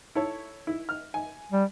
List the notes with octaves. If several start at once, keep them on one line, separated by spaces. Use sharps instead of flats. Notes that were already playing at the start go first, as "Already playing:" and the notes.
E4 A4 C#5
E4
F6
G#5
G3